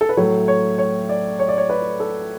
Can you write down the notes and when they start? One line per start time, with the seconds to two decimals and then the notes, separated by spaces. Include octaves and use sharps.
0.01 A4
0.09 B4
0.17 A2 F#3 A3 C#5
0.48 C#5
0.78 C#5
1.09 D5
1.39 C#5
1.49 D5
1.58 C#5
1.70 B4
2.00 A4